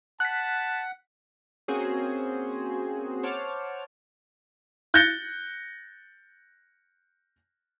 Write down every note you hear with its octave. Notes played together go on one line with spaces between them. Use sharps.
F#5 A5 F#6 B6
A#3 C4 C#4 F#4 G#4 C5
C5 C#5 F#5 A5 D6 F6
F#6 G6 A6 A#6 C#7 G7